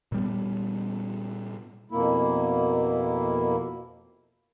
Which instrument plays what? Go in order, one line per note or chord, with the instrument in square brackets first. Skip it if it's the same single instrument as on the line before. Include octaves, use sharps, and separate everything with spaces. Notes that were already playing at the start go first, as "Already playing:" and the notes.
[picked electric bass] A#2 G3 B3
[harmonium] F2 B2 A#3 E4